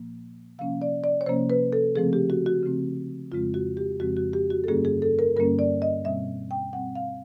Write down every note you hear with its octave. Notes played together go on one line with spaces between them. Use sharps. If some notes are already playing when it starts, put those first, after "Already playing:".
Already playing: A#2 F3 A#3
C3 F3 A#3 C#4 F5
D5
D5
C#5
C3 F3 A#3 C#4 C5
B4
A4
C#3 F3 A3 C4 G#4
G4
F#4
F#4
C#3 F3 A3 C4
F2 C#3 F3 G#3 C4 F4
F#4
G4
F2 C#3 F3 G#3 C4 F#4
F#4
G4
F#4
A4
G2 D3 G3 A#3 C#4 G#4
G#4
A4
A#4
G2 D3 G3 A#3 C#4 A#4
D5
D#5
B2 G3 C4 E5
G5
B2 G3 C4 F#5
F5